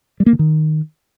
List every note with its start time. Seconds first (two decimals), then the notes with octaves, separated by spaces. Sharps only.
0.20 G3
0.26 A#3
0.33 D3
0.39 D#3